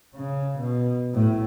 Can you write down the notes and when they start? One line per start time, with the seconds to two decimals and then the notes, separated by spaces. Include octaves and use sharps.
0.16 C#3
0.58 B2
1.14 A2 A3